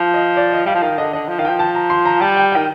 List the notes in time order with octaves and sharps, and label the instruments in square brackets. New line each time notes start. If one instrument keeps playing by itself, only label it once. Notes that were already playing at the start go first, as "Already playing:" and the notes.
Already playing: [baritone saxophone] F3
[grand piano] D#5
D5
D#5
[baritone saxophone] G3 [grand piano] F5
[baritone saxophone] F3
[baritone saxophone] D#3 [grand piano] F5
[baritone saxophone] D3 [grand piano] D#5
[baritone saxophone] D3 [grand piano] D#5
[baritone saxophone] F3
[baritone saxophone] D#3 [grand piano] F5
[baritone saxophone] F3 [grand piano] G5
[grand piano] A5
A#5
C6
A#5
[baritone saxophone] G3 [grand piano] A5
[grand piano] G5
[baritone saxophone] D#3 [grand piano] G5